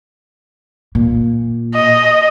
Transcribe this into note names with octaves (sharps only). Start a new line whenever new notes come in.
A#2
D#5